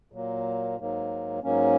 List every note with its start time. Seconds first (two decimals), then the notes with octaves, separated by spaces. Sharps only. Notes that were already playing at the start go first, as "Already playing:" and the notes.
0.12 A#2 F#3 A#3
0.78 G#2 F#3 A#3
1.43 G#2 F#3 A#3 C#4